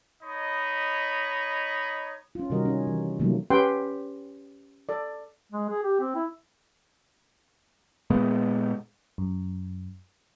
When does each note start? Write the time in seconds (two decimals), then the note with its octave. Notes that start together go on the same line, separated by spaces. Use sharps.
0.23 D#4 C#5 D#5 B5
2.35 C#4 F4
2.50 C3 D#3 G3 F#4 A#4 D#5
2.65 C#4
2.87 E3
3.19 C3 D#3 F3 F#3 A3 A#3
3.50 C#4 G4 B4 F#5 G5 C6
4.89 A4 D5
5.52 G#3
5.70 G#4
5.83 G4
6.00 C4
6.15 E4
8.10 A#2 G#3 B3
9.18 F#2